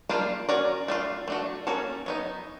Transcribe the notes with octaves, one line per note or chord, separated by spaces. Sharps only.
G3 A#3 D4 F4
C#4 F#4 A#4 D5
A3 D4 F4
A3 D4 F#4
A#3 C#4 F#4 A4
F#3 B3 D#4